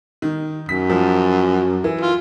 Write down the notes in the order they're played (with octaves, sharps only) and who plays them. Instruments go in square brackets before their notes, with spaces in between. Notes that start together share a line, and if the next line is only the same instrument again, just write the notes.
[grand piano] D#3
[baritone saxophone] F#2 [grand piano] B6
[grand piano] F3
E3
[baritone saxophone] F4